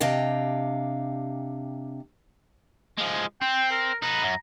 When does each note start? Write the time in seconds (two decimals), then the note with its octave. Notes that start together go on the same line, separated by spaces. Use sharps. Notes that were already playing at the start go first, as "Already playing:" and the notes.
0.01 C3 D4 D#5 F5 G5
2.98 F3 G#3
3.41 C4 G5
3.71 A#4
4.02 D#4 B4 A#5
4.23 F#2